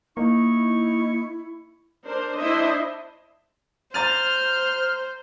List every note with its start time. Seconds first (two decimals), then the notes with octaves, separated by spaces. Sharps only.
0.17 A#3 D#4 E4 C#6
2.04 D4 A#4 C5
2.39 D4 E4 C5 D#5 E5
3.94 C5 A#5 F6 A6 D#7